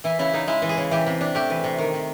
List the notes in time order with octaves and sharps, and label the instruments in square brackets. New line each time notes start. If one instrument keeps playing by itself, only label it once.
[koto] E3 E4
C#3 E4
C#3 D#4
G#3 E4
E3
G#4
C#3
E3 G4
C3
D4
A3 G4
E3
C3
D#3
C3